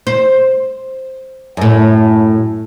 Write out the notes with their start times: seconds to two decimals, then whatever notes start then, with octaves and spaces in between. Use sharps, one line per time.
0.07 C5
1.57 F#2 A2